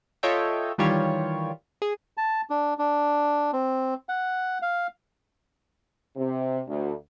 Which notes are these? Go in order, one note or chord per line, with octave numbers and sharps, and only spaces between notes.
F4 A4 C#5 D#5 E5 G5
D#3 E3 G3 F4 G4 C#5
G#4
A5
D4
D4
C4
F#5
F5
C3
D2